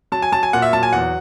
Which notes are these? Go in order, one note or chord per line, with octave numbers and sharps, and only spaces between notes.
F#3 A5
G#5
F#3 A5
G#5
A#2 F#5
E5
F#3 A5
G#5
E2 F#5